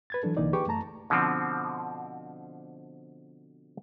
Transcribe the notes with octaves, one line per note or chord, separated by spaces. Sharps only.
B4 G#6 A6
E3 F#3 D4 A4
C2 D3 E3 A#3 D#4 D5
G4 G#4 B4 G5 C#6 D6
F#2 A3 A5 A#5
B2 D3 F3 C4